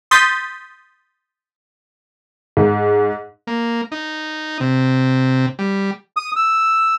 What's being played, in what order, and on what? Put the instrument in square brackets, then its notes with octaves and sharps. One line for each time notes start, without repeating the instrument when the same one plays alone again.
[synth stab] C6 D#6 G6 A6 B6
[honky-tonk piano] G#2
[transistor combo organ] A#3
D#4
C3
G3
[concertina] D#6
E6